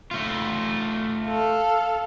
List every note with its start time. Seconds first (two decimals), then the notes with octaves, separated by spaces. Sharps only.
0.11 A3 F4
1.28 A4 F5